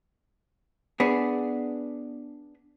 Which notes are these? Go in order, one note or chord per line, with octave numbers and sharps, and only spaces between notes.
B3 D4 G#4